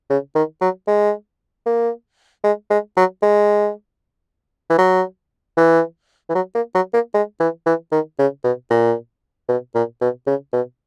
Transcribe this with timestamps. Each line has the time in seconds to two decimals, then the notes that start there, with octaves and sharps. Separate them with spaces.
0.10 C#3
0.35 D#3
0.61 F#3
0.88 G#3
1.66 A#3
2.44 G#3
2.70 G#3
2.97 F#3
3.22 G#3
4.70 E3
4.78 F#3
5.57 E3
6.29 E3
6.35 F#3
6.55 A#3
6.75 F#3
6.94 A#3
7.14 G#3
7.40 E3
7.66 E3
7.92 D#3
8.19 C#3
8.44 B2
8.70 A#2
9.49 B2
9.75 A#2
10.01 B2
10.27 C#3
10.53 B2